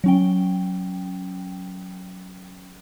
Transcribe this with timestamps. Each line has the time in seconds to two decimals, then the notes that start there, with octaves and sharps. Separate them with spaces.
0.04 F#3 C#4 G5